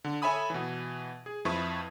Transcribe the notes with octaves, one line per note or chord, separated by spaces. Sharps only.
D3
A4 C#5 E5 G#5 B5 D#6
B2 E3
G#4
F2 F3 E4 B4 C#6 D#6